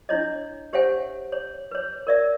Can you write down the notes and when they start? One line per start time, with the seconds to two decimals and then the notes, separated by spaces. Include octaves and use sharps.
0.09 D4 E4 C#5 D#5
0.73 G4 C5 C#5 E5 F#5 G#5
1.32 C#5
1.71 B4 C#5
2.07 A#4 D5 E5